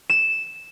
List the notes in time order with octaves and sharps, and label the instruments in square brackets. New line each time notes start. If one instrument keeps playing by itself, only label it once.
[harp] E7